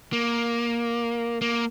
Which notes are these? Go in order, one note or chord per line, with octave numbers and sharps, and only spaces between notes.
A#3
A#3